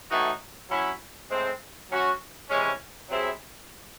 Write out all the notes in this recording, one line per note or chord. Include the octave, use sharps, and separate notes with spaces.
A2 E3 A3 D#4 F#4
F#3 C#4 E4
A2 G#3 C4
F#3 C#4 F#4
C3 E3 G#3 C#4
C3 F#3 C4 E4 G#4